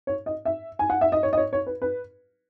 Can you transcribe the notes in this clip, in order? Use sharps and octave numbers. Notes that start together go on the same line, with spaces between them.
C#5
D#5
E5
G#5
F#5
E5
D#5
C#5
D#5
C#5
C#5
B4
B4